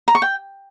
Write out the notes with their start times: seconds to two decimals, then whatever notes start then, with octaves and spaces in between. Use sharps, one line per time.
0.08 A#5
0.15 C#6
0.22 G5